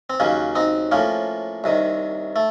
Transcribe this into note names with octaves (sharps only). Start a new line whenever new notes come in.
C4
D#2 C#3 F#3 A#3 C#4
C4 D#4
A2 F3 A#3 C#4
C2 C3 D#3
A3